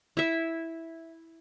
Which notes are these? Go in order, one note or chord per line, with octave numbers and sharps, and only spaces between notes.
E4 E5